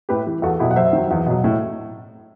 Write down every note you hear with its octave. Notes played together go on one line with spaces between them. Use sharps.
A2 G4 B4
E3
E2 F#4 A4
B2 F#3 E4 G4
F#5
F#2 C5 E5
D#3 F#3
E2
B2 F#3
A2